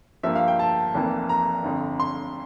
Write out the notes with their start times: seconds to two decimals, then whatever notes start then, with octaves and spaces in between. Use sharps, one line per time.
0.23 G2 F3 A#3 E5
0.35 F5
0.48 G5
0.59 A5
0.94 F1 F2 E3 A#3
1.29 A#5
1.64 G1 F2 D3
2.00 C6